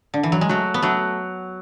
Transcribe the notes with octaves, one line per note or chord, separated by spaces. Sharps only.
D3
E3
F#3
G#3
F#3 A3
B3
F#3 A3